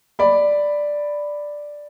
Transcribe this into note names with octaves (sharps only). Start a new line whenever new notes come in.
D5 B5